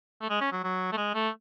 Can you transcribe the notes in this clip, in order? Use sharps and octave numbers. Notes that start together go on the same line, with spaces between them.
A3
G#3
C#4
F#3
F#3
A3
G#3
A3